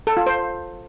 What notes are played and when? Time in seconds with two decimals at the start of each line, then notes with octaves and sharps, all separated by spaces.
0.07 A4
0.17 F4
0.27 C5